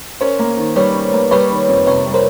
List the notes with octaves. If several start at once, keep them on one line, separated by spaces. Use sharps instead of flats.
C#4 A#4 C5
A#3
D#3
G3 B4 C#5
C#4
A#3
G3 B4 C#5
D#3
F2
C3 B4 C#5
G3
A#4 C5